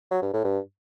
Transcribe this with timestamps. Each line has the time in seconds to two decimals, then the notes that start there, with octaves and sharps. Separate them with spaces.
0.11 F#3
0.22 G2
0.33 A2
0.44 G2